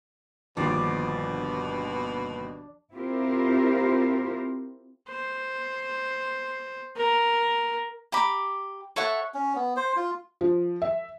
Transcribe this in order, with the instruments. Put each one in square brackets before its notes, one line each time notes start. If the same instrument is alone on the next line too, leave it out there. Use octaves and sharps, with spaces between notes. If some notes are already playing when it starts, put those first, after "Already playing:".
[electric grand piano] G1 D#2 C7 [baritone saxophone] B2 [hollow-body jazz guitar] F3 [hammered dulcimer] D4 D5
[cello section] C4 E4 F4 G4 A#4 C5
[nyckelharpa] C5
A#4
[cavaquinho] G4 A#5 B5 D6
A4 C#5 E5 F#5
[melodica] C#4
B3
C5
F4
[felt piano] F3
E5